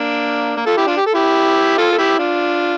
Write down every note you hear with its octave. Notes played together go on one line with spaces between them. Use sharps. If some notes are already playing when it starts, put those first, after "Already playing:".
Already playing: A#3 D4
A#3
F4 A4
E4 G4
D4 F4
G4
A4
E4 G4
F4 A4
A4
E4 G4
D4 F4